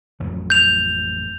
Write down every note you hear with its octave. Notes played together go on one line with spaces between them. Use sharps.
A1 F2 F#3
G6 F7